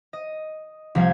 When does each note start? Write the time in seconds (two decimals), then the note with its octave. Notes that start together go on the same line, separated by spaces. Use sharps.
0.13 D#5
0.95 C2 F3 G3 F5 G6 G#6